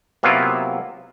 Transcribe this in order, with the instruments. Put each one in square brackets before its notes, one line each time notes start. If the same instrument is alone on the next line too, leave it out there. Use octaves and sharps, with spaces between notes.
[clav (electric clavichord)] C3 F#3 A#3 B3 E4 F4